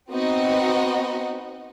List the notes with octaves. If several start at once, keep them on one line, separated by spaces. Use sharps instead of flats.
B3 C4 D#4 F#4 D#5